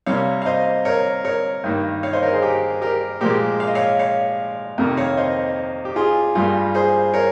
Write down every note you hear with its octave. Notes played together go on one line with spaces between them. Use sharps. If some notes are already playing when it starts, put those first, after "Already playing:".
C3 G3 A#3 C#5 F5
F5
C5 D#5
A#4 C#5
A#4 C#5
G2 D#3 A#3
C#5 F5
C5 D#5
A#4 C#5
G#4 C5
G4 A#4
G4 A#4
A#2 F3 G#3 G4 A#4
F5
D#5
C#5 F5
C#5 F5
F2 C3 D#3 A#3
C#5 F5
C5 D#5
G4
F4 G#4
G2 G3 A#3 F4 G#4
G#4 C5
A#4 C#5